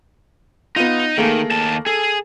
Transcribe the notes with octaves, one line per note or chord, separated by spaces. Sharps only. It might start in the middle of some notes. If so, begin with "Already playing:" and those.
B3 D#4 F4
D#3 A3 A#3 G#4
D#2 A5
G#4 A4